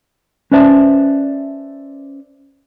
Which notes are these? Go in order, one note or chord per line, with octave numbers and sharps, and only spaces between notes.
C#4 B4 C5 D5 E5 A5